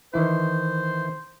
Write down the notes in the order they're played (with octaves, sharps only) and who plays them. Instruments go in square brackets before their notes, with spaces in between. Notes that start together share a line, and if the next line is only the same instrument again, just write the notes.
[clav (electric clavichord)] D#3 E3 E4 [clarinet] C5